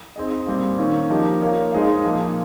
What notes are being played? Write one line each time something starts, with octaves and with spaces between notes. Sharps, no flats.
C4 D#4 G#4 D#5
A#2 G3 C4
D#3 A#3 C#4
F3 A#3 D#4 G4
A#3 F4 A#4 C#5
G#3 D#4 G#4 C5 F5
A#2 F3 A#3 F4